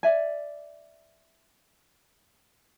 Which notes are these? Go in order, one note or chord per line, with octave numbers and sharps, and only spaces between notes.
D5 E5 G#5